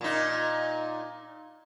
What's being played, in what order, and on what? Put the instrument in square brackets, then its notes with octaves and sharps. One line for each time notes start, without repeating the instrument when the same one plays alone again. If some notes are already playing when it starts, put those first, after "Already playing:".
[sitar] A#2 D#4